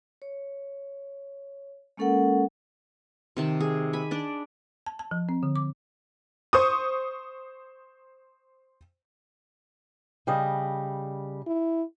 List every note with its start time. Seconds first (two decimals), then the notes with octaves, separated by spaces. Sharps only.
0.22 C#5
1.97 G#3 A#3 C#4 A4 A#4 F#5
3.37 C3 D#3 A5
3.60 G#4
3.93 G#5 B5
4.11 D4 D5
4.86 A5
4.99 A5
5.11 F3
5.29 C4
5.43 D3
5.56 D6
6.53 C5 C#6 D#6
10.27 C#3 G3 D#5
11.47 E4